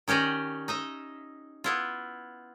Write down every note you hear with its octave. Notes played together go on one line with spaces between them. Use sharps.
D#3 C#4 G4 D5 D#5
D#4 D#5 E5
B3 E4 F4